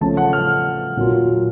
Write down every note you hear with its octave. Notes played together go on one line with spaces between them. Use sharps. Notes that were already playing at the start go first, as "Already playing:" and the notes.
C#3 F3 A3 C#4 A5
F#5
F6
A#2 F#3 A#3 F4